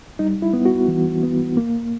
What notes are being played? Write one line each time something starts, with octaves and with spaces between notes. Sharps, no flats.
G3 D#4
E4
B3
F#4
E3
B3
A#3